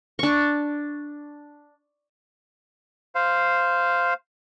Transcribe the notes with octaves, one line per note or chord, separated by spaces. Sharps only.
D4 C#6
C5 F5